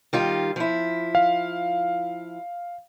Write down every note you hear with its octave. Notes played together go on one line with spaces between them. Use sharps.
D#3 G3 F4
F3 E4
F5